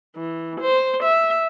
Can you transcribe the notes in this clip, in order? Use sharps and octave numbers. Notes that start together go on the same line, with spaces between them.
E3
C5
E5